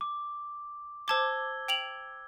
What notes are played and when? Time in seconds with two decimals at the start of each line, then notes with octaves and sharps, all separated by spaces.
0.01 D6
1.08 C5 A5 D6 E6 G#6 G7
1.68 G5 F7 F#7